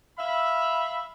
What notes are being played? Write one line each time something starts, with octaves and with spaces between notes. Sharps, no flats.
E5 F5 B5